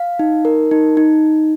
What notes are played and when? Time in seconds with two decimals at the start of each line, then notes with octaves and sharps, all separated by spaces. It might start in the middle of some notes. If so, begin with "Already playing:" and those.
Already playing: F5
0.19 D#4
0.45 A#4
0.71 D#4
0.97 D#4